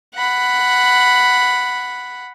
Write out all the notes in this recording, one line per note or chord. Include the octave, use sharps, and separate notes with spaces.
F#5 B5